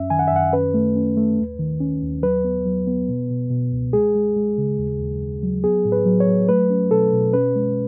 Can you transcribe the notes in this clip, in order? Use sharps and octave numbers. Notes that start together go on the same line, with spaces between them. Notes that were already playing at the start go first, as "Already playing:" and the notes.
Already playing: F#2 C#4 E5
D#3 G#5
F#5
E5
F#2 F#5
C#4 B4
A3
C#4
A3
D#2
D#3
C#4
D#2
F#3 B4
B3
F#3
B3
B2
B2
B2
C#2
G#3 G#4
G#3
G#3
C#3
D#2
D#2
D#2
F#3
B3 G#4
A2
B4
F#3
C#5
F#3
A3 B4
C#4
B2 A4
B2
C#4 B4
G#3